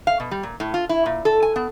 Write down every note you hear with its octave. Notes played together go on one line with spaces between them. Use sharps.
F5
B2
G3
A#2
A2
F4
E4
A#2
A4
G#5
B3